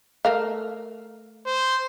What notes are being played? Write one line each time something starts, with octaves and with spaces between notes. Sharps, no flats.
A3 A#4 F5
C5